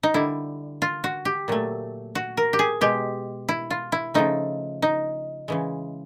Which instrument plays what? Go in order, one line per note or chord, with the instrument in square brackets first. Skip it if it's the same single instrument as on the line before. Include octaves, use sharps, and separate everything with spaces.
[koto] D#4
D3 G3 E4
F4
F#4
G4
A#2 F#3 A3
F#4
A#4
G4
G#4
B2 G#3 G4
E4
F4
E4
C#3 F3 A3 D#4
D#4
C#3 E3 G#3